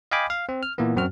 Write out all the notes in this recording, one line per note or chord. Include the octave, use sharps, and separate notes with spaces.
D#5 F5 G5 G#5 B5 D6
F5
C4
F6
A#2 E3 A#3 B3
F#2 C4 F#4 F6